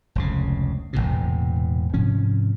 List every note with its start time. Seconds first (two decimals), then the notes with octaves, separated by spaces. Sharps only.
0.15 F1 C#2 C#3
0.93 E1 B1 A2 C3
1.94 G#2 C3 F3 C#4